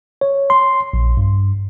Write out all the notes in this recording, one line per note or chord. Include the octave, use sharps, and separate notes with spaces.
C#5
C6
A#1
G2